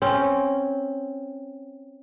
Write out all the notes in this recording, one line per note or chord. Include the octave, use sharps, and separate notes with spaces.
C4 C#4